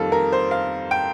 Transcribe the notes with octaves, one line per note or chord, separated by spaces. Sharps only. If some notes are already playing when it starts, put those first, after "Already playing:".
Already playing: F2 D#3 G3 A#3 A4 F5
A#4
C5
F5
G5